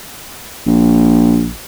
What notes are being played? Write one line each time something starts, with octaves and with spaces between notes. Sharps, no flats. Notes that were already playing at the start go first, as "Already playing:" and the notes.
A#1